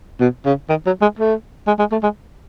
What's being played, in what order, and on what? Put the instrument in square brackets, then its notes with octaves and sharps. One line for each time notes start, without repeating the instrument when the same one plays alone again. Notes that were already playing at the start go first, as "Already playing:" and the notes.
[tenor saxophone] B2
C#3
D#3
F#3
G#3
A3
G#3
G#3
A3
G#3